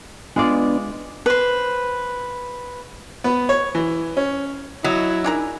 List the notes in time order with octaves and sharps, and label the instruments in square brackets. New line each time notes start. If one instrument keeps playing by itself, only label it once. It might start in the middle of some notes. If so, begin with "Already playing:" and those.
[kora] G#3 F4 D5 [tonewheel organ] B3 D4
[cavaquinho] B4 C5
[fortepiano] B3
C#5
E3
C#4
[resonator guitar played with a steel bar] F#3 [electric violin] E4 [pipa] D#5
[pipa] D4 G#4 A#4 [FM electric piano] D#4 G#5